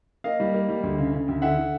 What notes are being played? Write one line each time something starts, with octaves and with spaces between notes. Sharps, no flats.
A#3 D#5 F5
G3
A#3
G3
D2
C#3
C#3
D2
D3 E5 F#5
D3